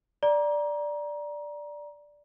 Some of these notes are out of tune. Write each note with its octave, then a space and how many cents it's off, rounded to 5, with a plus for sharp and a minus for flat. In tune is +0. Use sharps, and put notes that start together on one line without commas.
D5 +0 A#5 +25